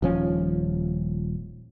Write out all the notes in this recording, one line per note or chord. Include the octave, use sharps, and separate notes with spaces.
D#1 F3 C#4